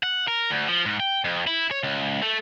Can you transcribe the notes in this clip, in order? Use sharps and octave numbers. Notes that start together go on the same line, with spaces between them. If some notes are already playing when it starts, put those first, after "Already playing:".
F#5
A#4
D2
F3
G#2
G5
F2
E4
C#5
C#2
A3